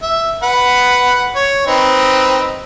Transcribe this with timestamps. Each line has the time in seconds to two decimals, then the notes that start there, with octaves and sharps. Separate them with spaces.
0.03 E5
0.43 B4 F#5
1.36 C#5
1.67 C4 D#4 B4